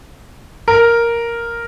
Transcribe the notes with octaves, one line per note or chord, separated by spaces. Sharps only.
A#4